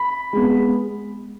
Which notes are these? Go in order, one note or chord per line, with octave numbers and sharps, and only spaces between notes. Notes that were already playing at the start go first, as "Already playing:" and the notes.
Already playing: B5
G#3 B3